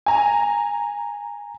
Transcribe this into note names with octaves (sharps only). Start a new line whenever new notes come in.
G#5 A#5